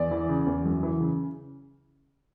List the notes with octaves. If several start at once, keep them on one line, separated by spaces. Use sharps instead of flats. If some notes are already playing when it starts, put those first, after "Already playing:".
Already playing: E2 D5
E3
C#3
E2
F#2
E3
C#3